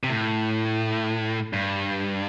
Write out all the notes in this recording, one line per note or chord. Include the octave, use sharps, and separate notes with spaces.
C3
A2
G2